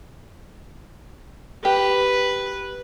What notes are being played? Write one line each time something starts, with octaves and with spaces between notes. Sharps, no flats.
G4 B4